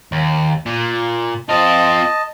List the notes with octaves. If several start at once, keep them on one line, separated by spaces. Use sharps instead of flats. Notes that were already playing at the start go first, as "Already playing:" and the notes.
D#2
A#2
C4 F4 D#5 A5